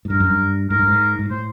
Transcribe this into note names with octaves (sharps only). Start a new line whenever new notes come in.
G#2
G2 A#4
F#2
G2
G#2 A#4
G2
G#2
G#2
A2 C5